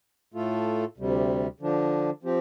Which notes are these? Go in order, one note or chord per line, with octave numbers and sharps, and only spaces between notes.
A2 A3 F4 A4
D2 C3 G3
D3 F3 D4
F3 C4 G4